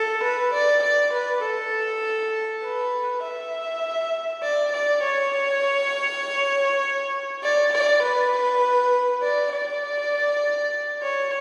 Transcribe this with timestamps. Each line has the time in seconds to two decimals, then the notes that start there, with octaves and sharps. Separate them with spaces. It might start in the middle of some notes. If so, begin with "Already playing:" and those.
Already playing: A4
0.24 B4
0.54 D5
0.84 D5
1.14 B4
1.43 A4
2.64 B4
3.24 E5
4.43 D5
4.74 D5
5.03 C#5
7.43 D5
7.73 D5
8.03 B4
9.23 D5
9.53 D5
11.03 C#5